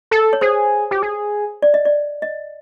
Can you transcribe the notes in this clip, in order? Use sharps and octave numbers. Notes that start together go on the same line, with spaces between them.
A4
C#5
G#4 C5
G4
G#4
D5
D#5
D5
D#5